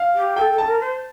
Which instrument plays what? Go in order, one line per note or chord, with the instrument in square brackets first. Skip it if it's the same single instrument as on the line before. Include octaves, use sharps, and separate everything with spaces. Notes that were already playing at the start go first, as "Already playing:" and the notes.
Already playing: [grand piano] F5
[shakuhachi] G4
[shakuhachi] A4 [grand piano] G5
[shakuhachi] A4
[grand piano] A5
[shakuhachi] A#4
C5